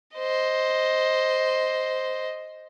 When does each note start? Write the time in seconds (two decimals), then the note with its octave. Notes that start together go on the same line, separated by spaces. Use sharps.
0.16 C5 D#5